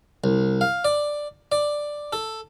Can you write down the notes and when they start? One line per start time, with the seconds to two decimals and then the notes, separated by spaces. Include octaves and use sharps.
0.24 C2
0.61 F5
0.85 D5
1.52 D5
2.13 A4